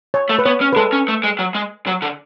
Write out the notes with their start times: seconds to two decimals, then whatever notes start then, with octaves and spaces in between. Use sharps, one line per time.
0.14 C#5
0.29 A3
0.39 B4
0.45 B3 C#5
0.61 C#4
0.73 B4
0.76 G#3 A4
0.93 C#4
1.08 A3
1.23 G#3
1.39 F#3
1.55 G#3
1.87 F#3
2.02 D3